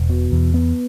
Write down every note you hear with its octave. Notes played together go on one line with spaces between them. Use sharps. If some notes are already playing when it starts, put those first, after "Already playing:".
Already playing: E1
B2
E2
B3